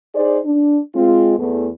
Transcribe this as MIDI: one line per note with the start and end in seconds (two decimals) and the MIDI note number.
0.15 0.38 63
0.15 0.38 68
0.15 0.38 72
0.15 0.38 74
0.44 0.78 62
0.94 1.36 56
0.94 1.36 60
0.94 1.36 65
1.37 1.67 40
1.37 1.67 57